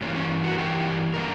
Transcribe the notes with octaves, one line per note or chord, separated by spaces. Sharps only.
G2 E3 A#3 C#4
C#4
F#4
A#4
G2 E3 A#3 G4
D3 G3 A#3 A#4